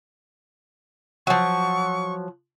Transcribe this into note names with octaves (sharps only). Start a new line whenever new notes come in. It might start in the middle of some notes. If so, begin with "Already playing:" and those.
F3 F#3 C#6